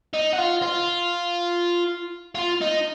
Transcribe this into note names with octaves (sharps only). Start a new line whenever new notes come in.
D#4
F#4
F4
F4
F4
D#4